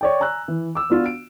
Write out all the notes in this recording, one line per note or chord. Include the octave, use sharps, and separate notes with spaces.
C#5 D5 G5
G#5 A#5 E6 F#6
E3
D6 E6
B3 D4 F4 F#4
D7